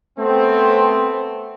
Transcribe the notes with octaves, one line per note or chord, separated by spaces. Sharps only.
A3 B3 C4